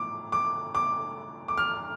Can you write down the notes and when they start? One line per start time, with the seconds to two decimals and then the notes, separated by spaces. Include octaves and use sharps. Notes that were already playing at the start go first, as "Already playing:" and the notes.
Already playing: A2 F3 D6
0.32 D6
0.75 D6
1.48 D6
1.57 F6